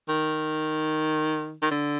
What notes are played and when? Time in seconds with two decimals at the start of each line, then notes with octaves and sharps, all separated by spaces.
0.09 D#3
1.62 D#3
1.71 D3